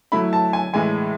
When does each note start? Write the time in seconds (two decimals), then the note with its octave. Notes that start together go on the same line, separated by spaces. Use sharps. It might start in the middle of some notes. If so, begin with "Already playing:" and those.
0.12 F#3 A3 E4 B5
0.33 A5
0.53 G#5
0.74 A2 E3 G#3 G#5